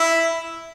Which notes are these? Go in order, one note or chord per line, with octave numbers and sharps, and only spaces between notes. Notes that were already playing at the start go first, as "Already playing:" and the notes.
Already playing: E4